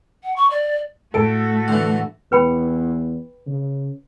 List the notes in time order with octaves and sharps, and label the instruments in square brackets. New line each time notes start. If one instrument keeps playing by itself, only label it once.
[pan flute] F#5
C#6
D5
[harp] A2 D7 [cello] A3 F#4 [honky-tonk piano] A4
[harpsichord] D3 E3
[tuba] E2 [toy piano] B4 G5 B5
[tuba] C#3